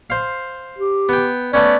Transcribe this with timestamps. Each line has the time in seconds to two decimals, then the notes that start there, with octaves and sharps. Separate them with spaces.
0.10 C5 F5
0.78 G4
1.09 B3 G5
1.53 A3 B3 C#4 D5